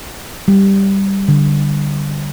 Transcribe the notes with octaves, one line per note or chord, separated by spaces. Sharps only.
G3
D3